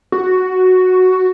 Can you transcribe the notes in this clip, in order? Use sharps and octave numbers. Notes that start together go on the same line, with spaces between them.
F#4